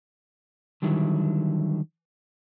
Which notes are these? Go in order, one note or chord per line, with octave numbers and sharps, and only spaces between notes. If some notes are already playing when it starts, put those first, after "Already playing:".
D3 D#3 F#3 G3 E4